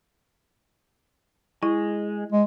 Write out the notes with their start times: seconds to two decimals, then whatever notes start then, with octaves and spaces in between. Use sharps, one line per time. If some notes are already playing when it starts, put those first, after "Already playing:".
1.63 G#3 E4
2.32 G#3